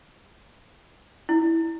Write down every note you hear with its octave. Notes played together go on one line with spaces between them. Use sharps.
E4